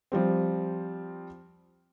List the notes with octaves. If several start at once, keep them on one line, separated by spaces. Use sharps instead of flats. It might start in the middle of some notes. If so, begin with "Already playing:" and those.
F3 G3 C4